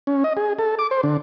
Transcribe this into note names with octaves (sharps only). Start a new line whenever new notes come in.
C#4
D#5
G#4
A4
D6
C5
D3